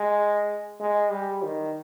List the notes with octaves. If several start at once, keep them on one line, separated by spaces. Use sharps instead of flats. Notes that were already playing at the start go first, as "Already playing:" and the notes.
Already playing: G#3
G#3
G3
D#3